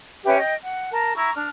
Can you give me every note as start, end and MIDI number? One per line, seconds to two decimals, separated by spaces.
0.24 0.37 61
0.24 0.37 67
0.24 0.37 71
0.24 0.37 76
0.38 0.53 75
0.38 0.53 79
0.62 0.88 78
0.92 1.12 70
0.92 1.12 81
1.15 1.30 64
1.15 1.30 82
1.15 1.30 85
1.35 1.48 62
1.35 1.48 89